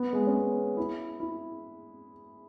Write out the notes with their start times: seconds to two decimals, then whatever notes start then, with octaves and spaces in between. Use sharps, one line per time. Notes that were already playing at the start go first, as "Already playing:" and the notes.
Already playing: B3
0.13 G#3
0.27 C#4
0.34 B3
0.77 E4
1.20 E4